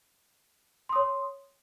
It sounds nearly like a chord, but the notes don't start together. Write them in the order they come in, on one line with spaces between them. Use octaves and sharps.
C6 D#6 C#5